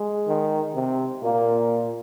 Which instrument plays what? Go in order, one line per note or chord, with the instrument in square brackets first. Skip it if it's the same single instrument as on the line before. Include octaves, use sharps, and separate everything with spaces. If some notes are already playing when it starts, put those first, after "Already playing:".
Already playing: [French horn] G#3
[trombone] D#3
C3
[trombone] A#2 [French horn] A#3